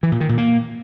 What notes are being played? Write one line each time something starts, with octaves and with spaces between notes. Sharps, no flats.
E3
A#2
D#3
A#2
A#3